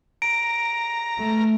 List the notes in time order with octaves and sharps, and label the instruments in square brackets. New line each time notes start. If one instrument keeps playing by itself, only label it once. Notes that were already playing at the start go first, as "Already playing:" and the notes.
[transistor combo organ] A#5 [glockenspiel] D7
[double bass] A3